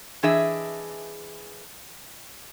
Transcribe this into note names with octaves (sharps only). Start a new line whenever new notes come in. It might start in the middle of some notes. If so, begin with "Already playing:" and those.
E3 D4 G#4 D#5 E5